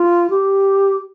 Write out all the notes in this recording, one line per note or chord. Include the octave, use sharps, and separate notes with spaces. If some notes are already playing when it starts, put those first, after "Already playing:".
Already playing: F4
G4